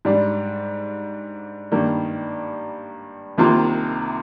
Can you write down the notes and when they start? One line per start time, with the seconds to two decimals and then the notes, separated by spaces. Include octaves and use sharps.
0.05 G#2 G3 D4
1.72 G2 D#3 G3 A#3
3.38 C2 C3 D#3 A#3 F4